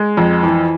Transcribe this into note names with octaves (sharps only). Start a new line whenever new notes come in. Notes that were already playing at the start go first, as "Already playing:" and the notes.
Already playing: G#3
F2
E3